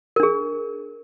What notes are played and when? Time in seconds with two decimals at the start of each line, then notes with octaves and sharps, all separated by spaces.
0.16 A#4
0.20 D4
0.23 G#4